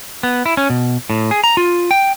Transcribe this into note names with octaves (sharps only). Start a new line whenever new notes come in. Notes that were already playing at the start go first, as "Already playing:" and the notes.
B3
E4
C#4
B2
A2
G#4
A#5
F4
G5